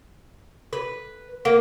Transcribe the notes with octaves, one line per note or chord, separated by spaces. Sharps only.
B4
A#3